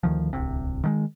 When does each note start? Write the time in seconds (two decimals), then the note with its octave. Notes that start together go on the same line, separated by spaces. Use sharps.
0.03 D2 D#3 F3
0.33 D1 C2 C3
0.84 D#3 F3 G#3